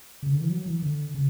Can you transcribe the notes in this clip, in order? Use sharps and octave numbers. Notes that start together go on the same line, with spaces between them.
C#3
D3
E3
F#3
E3
D3
C#3